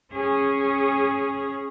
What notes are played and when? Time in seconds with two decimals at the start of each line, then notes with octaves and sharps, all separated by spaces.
0.13 C#4 G#4